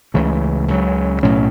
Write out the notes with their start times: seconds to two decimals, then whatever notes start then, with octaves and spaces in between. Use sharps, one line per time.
0.14 C#2 C#3 E3 A3
0.68 C#2 C#3 F#3
1.23 B1 A2 F#3 C#4